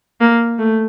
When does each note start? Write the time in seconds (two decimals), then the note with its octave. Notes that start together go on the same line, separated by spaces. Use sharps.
0.20 A#3
0.58 A3